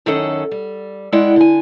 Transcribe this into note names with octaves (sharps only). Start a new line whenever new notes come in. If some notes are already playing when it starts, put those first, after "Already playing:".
F#2 D#3 C#4 A4 F#5
G3
G#3 E4 D5 F#5 G5
D3 G#5